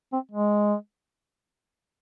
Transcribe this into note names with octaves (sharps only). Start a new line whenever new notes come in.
C4
G#3